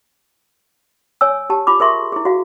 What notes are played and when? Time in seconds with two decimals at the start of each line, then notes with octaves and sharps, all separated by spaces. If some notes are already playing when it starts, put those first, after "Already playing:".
1.21 C#5 G#5 E6
1.50 G4 A5
1.67 F4 B5 D6
1.80 G#4 A#4 E5 C6 C#6
2.12 E4 G#4
2.25 F#4 F5